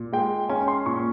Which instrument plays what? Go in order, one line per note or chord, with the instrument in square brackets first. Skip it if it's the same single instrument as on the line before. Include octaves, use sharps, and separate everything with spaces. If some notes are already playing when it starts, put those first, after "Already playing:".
Already playing: [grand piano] A#2
G#3 G5
C#4 G#5
C6
A#2 C#6